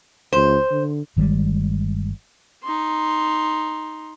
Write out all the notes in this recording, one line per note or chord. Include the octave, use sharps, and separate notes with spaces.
C#2 C5
D3
G1 D#3 G3 G#3
D#4 C6